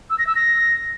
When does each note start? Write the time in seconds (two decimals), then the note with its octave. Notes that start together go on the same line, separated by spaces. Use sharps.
0.10 E6
0.18 A#6
0.27 E6
0.35 A#6